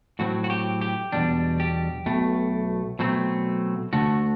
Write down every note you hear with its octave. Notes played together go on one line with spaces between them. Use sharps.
A2 F#3 C4 F#4
F#4
G4
G4
E2 B2 G3 D4
G4
B1 B2 A3
B2 F#3 A3 C4
D2 D3 A3 F#4